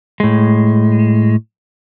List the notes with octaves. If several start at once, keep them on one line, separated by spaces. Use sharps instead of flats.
A2 G#3